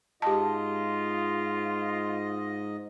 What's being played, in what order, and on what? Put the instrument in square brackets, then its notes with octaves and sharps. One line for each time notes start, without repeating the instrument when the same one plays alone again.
[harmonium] G#2 D#5 [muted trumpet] F4 [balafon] G4 A5